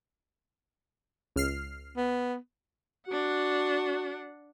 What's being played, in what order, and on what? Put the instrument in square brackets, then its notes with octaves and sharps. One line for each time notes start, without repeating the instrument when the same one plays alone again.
[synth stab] C#2 F6 C7
[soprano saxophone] B3
[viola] D4 F#5 [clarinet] F#4